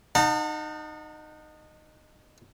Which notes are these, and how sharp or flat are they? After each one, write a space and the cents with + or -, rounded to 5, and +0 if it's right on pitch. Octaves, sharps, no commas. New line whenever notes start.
D#4 -15 F#5 -30 A5 +40